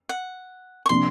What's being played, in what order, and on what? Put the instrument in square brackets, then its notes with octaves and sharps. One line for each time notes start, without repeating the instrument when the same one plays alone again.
[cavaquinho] F#5
C#6
[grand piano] C3 F3 A#3 D4 [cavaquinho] C6